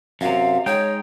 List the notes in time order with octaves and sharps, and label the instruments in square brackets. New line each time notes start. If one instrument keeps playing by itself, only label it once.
[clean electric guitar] F#2 C3 [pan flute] F5
[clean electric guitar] G#3 D#4 G5 [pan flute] C#5